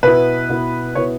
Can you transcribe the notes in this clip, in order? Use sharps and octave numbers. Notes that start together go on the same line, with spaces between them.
B2 B3 E4 B4
B2 B3 E4
B2 B3 E4 C#5